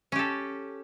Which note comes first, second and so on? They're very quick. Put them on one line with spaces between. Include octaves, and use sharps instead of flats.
C#4 G4 A4